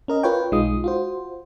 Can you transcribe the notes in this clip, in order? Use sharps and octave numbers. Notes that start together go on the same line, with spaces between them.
C#4 A#4 D#5
F4 B4 C#5 G5
B1 G#3 D#4 F4 D#6
F4 F#4 C5